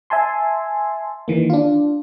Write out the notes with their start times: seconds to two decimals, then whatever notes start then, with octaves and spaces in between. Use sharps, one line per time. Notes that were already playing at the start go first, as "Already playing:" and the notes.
0.10 E5 G#5 A5 C6
1.28 D#3 E3 A#3
1.50 D4 F4